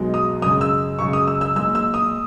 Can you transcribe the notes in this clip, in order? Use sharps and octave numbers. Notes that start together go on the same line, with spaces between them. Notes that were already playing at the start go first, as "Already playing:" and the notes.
Already playing: B1 B2 G#3
D#6
F#2 C#3 G#3 D#6
E6
F#2 C#3 G#3 C#6
D#6
E6
E6
B1 A#2 G#3 E6
E6
D#6